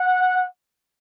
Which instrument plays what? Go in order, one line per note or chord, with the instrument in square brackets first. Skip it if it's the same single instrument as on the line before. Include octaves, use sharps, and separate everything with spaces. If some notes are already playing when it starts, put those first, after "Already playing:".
Already playing: [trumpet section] F#5